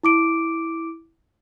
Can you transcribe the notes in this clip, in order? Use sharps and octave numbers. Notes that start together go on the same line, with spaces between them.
E4 D6 D7